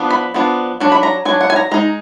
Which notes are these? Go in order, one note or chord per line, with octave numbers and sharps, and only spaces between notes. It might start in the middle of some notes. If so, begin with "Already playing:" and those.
Already playing: F3 B3 D4
B5
F3 B3 D4
F#3 D4
B5
A#5
F#3 D4 G#5
F#5
G#5
A#5
G#3 D#4 A#5